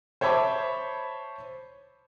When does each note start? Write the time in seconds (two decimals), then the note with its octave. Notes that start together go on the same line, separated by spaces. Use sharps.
0.21 C5 C#5 E5 A5 B5 D6